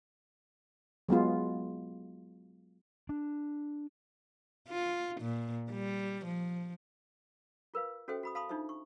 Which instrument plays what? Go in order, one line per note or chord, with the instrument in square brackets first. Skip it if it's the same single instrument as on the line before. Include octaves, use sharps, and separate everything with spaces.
[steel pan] F#3 G#3 B3 F4
[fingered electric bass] D4
[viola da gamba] F4
A#2
G3
F3
[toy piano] F4 A#4 B4 F5
C#4 F#4 A4 C5 E5 G5
F#4 B5 D#6
F5 A5 B5 C6 D#6
D4 D#4 F4 C5 E5
C#6